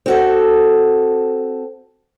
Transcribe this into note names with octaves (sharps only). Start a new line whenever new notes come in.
C4 F#4 A4